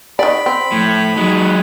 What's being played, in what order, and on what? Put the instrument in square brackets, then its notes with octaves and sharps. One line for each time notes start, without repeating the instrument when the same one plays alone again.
[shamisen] D#3 D5 [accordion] B5
[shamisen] C4
[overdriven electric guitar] A2 [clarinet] F3
[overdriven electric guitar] F#3 G#3 [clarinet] D#4